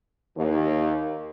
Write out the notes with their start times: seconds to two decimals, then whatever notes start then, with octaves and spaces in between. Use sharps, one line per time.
0.36 D#2